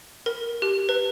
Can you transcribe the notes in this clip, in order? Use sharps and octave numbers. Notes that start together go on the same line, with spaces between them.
A#4
G4
B4